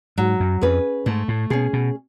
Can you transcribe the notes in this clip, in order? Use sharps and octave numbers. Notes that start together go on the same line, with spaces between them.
G#2 F#3
F#2
F2 C#4 G#4 B4
G#2 A3
A2
B2 C#4 G#4
B2